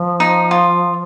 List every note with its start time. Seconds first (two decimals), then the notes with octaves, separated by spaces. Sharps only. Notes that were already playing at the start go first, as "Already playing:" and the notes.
Already playing: F3
0.20 D#4
0.51 F4